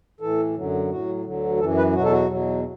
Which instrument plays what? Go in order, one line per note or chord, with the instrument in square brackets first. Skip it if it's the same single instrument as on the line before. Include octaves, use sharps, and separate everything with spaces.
[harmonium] A2 E3 A4
F#2 D3 F#3
A2 F#3 F#4
D2 D3 F#3
F#2 E3 A4
B4
E2 B2 F#3 F#4
A4
F#4
E2 B2 F#3